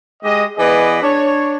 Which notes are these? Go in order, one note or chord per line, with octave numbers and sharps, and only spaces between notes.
G#3 G4 D#5
E3 B3 G#4 B4 D5 D#5
D4 C#5